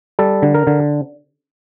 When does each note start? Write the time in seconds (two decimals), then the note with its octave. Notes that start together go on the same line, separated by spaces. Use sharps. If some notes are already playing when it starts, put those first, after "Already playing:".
0.19 G3 A4
0.42 D3
0.54 A#4
0.67 D3